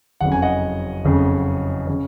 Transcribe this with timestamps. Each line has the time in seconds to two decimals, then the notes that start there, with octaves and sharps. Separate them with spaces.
0.21 F#1 F2 C#3 F#5
0.32 G#5
0.42 D#5 F#5
1.05 F#1 F2 C#3
1.87 C#3